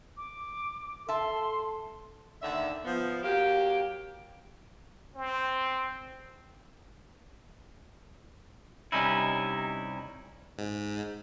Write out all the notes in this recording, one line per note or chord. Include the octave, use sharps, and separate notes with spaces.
D6
A4 E5 A5 C6
D#2 D3 E5
F3 B3
F#3 A#3 G4
C4
C3 G3 C#4 D#4 E4
G#2